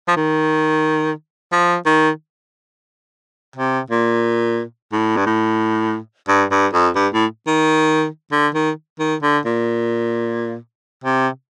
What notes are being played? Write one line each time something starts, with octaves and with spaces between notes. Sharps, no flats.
F3
D#3
F3
D#3
C3
A#2
A2
G2
A2
G2
G2
F2
G2
A2
D#3
D3
D#3
D#3
D3
A#2
C3